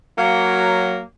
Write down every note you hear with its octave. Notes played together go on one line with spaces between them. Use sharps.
F#3 A#3